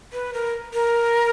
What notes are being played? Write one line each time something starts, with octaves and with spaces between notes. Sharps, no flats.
B4
A#4
A#4